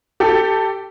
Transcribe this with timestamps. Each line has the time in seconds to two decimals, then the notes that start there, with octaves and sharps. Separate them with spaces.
0.20 G4 A4